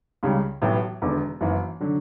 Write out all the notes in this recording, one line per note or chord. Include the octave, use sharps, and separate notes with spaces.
C#2 C#3 G3
A1 A2 F#3 B3
E1 E2 D3
F#1 F#2 E3
D3 F#3